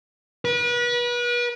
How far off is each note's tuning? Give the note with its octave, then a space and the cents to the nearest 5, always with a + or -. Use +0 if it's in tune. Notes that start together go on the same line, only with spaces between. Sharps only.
B4 -35